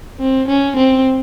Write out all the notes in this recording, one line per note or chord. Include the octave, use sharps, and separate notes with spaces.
C4
C#4
C4